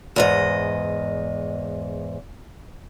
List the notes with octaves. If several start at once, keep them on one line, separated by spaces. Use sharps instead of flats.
E2 G#2 D#5